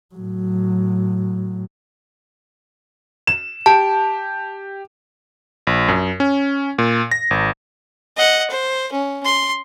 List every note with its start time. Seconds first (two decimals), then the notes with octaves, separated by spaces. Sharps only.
0.15 A2 F#3
3.27 E7
3.66 G4 A5
5.67 A#1
5.88 F#2
6.20 C#4
6.78 A#2
7.11 A#6
7.31 G#1
8.17 D#5 F#5
8.50 C5
8.92 C#4
9.25 C6